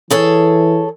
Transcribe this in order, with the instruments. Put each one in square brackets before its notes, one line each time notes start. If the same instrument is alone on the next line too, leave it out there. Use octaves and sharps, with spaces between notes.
[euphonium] E3 [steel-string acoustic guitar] G#4 A4 C#5